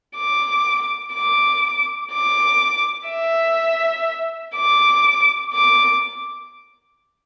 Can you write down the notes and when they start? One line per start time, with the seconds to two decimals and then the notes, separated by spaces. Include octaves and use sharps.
0.17 D6
1.14 D6
2.12 D6
3.09 E5
4.56 D6
5.54 D6